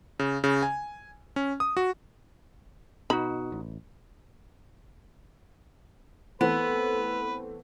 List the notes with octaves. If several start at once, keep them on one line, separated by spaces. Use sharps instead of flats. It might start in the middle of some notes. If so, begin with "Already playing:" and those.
C#3
C#3
G#5
C#4
D#6
F#4
B2 D#4 F#4 B5
A1
E3 A3 B3 C4 A4 B4